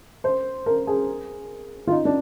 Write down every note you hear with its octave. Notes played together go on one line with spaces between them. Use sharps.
C5
A#4
G#4
F4
D#4
D4